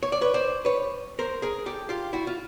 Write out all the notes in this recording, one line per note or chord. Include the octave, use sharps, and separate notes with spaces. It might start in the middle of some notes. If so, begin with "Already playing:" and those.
C#5
D5
B4 C#5
C5 D5
B4 C#5
A#4 C5
G#4 A#4
G4 A4
F4 G4
E4 F#4
F4